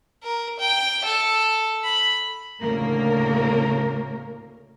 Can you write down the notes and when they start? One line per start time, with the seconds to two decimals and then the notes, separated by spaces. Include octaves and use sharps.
0.23 A#4
0.60 G5
1.05 A4
1.84 B5
2.61 D2 A2 C#3 A#3 A#4